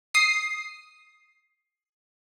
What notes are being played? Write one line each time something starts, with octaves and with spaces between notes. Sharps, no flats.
D#6 C7